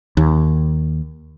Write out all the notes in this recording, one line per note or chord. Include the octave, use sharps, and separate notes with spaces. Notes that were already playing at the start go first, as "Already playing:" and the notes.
D#2